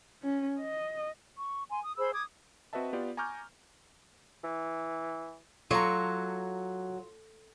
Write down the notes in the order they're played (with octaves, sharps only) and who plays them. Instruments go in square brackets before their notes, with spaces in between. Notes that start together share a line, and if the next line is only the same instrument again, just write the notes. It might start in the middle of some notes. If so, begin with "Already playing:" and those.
[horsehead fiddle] C#4
D#5
[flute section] C#6
G#5 C6
D#6
G#4 C5 B5 E6
D6 D#6 G#6
[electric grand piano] C4 F#4 B4 D#5 E5 A5
B3 F4 G4 D5
G#5 A#5 C#6 D6 F6 G6
[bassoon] E3
[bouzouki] F#3 [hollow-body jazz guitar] F4 [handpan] A4 [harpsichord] A#5 C#6